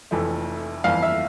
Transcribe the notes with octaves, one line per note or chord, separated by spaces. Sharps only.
F1 F2 E3 A3
G1 F2 E3 F5
E5